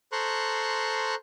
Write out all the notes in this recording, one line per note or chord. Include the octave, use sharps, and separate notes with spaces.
A4 C5 A#5 C6 C#6 F#6